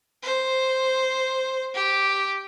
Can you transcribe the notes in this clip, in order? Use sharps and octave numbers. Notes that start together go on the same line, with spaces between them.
C5
G4